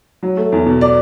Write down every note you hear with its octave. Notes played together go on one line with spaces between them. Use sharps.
F#3
A3
E2
B2
D5